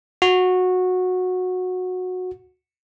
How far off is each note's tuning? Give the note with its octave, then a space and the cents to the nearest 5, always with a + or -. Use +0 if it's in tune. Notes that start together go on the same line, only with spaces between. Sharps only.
F#4 -15